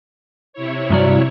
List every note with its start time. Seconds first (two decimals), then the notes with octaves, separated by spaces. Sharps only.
0.53 C3 E4 C#5
0.90 G2 F#3 D5